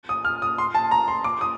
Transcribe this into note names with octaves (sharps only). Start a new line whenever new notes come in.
D#6
F6
D#6
C6
A5
A#5
C6
D6
D#6